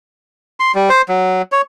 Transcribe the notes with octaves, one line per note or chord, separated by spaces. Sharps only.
C6
G3
C5
F#3
C#5